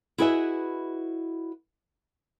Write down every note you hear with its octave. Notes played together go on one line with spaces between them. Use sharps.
E4 F#4 G#4 B4 D#5 E5